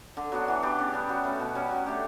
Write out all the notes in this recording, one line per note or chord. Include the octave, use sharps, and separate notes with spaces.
D3
F#3 B3 D4
E3
B3 D4 G4
C#3
G3 D4
F#3
A3 C#4
B2
G3 C#4
F#3
A3 D4 G4